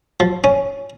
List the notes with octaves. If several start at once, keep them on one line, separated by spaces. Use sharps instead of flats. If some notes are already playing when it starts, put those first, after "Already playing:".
F3
C#4